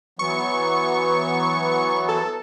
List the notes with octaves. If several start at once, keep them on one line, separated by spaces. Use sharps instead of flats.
E3 F#3 B3 C#6
A4